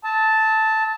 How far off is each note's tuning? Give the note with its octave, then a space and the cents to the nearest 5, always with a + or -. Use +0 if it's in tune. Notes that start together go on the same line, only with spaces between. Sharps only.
A5 +0 E6 -45